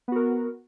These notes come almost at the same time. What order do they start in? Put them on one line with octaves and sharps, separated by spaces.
B3 F#4 A#4